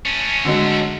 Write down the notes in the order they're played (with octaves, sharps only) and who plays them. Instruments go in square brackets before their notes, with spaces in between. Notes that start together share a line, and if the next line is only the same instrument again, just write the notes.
[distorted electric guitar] A3 C#4
[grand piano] D3 F#3 G#3